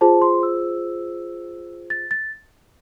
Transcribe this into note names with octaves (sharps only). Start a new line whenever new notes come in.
F4 G#4 C5 A5
C6
E6
A6
A6